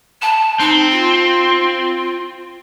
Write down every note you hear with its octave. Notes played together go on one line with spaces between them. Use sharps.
A5
C4 D#4
F4